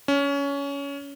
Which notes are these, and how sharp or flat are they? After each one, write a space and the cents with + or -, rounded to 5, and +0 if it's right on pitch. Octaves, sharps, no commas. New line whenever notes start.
C#4 +20